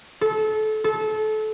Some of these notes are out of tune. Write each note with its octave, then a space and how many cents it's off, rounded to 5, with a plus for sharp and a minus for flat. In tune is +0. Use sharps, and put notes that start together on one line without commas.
A4 -25
A4 -25